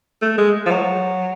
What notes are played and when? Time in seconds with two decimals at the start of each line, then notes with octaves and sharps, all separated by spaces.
0.22 A3
0.38 G#3
0.66 F3
0.71 F#3